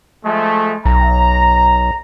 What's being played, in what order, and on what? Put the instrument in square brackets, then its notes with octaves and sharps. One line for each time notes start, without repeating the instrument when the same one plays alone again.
[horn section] F3 G#3 A3
[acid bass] B1 [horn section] A#5